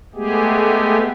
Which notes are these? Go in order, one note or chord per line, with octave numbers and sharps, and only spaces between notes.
G#3 A3 B3 G4 G#4